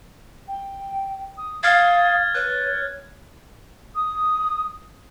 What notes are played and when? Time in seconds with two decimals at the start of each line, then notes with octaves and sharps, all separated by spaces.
0.47 G5
1.37 D#6
1.63 F5 D#6 F6 G#6 A6
2.34 B4 C#5 F#6
3.96 D#6